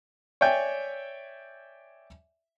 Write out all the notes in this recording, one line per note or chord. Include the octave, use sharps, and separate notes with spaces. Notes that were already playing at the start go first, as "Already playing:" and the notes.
C#5 D5 E5 G5 G#5